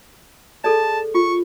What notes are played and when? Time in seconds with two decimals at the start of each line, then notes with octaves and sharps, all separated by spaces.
0.64 G#4 A4 D5 A5
1.15 F4 C#6